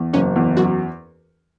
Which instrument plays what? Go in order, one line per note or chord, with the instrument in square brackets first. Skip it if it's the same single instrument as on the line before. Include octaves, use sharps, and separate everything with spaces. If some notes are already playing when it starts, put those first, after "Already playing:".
Already playing: [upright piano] E2
[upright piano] F#1 [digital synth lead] C#4
[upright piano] E2
[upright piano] F#2 [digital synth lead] F#4